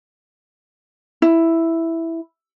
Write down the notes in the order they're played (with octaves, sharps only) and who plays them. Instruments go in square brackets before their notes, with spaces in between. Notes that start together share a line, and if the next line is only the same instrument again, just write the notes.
[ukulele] E4